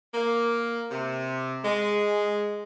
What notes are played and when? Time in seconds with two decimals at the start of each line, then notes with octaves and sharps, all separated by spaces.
0.14 A#3
0.91 C3
1.64 G#3